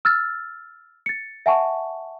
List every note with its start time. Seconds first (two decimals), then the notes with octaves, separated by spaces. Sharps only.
0.05 E6 F6 A6
1.06 A6 C#7
1.46 E5 F#5 G#5 A5 C#6